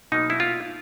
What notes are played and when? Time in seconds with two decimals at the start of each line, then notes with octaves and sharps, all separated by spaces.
0.12 B2 F#3 A#3 D#4
0.30 E4
0.40 F4